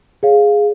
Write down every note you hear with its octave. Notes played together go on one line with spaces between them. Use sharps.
G#4 C#5 F5